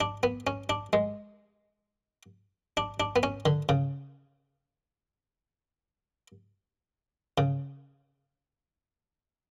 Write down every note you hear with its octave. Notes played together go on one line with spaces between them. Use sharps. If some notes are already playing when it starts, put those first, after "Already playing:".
D4
B3
C#4
D4
G#3
D4
D4
B3
C#4
D3
C#3
C#3